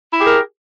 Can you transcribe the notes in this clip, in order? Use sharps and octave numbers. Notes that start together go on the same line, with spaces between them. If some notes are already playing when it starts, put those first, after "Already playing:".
E4 G4 G#4 A#4